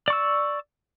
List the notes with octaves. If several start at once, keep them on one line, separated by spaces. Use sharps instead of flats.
D5 C#6 E6